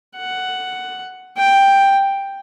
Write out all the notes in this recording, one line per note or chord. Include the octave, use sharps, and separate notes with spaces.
F#5
G5